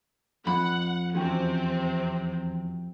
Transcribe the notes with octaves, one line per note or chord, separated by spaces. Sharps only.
F2 F#5 B5
E2 C3 C4 C#4 F#4 G5